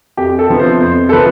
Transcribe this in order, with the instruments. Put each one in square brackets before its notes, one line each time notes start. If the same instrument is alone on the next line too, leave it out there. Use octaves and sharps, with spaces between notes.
[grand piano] F2 G4
A4
C3 F3 B3
C5
F2 C5
A4
C3 F3 B3 B4